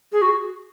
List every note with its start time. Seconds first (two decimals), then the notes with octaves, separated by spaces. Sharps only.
0.12 G#4
0.22 F#4